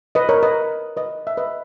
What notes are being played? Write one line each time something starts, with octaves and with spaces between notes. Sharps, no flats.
B4 D#5
A#4 C#5
B4 D#5
B4 D#5
E5
B4 D#5